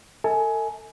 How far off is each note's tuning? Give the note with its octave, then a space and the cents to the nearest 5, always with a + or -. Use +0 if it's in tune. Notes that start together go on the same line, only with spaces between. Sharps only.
A4 +35 E5 -45 G#5 +20